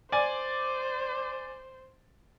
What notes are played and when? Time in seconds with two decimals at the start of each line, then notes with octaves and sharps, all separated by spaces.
0.12 C5 D5 G#5